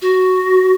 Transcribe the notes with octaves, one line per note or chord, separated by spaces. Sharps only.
F#4